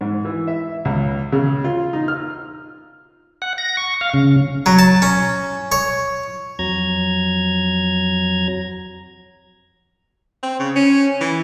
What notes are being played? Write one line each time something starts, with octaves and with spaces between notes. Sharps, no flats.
G#2
E3
E5
C#2
C#3
F4
D#4
F6
F#5
A#6
C#6
F5
C#3
F#3
A5
C#4
C#5
F2 F#3 A#5 G#6
C4
C#3
C#4
E3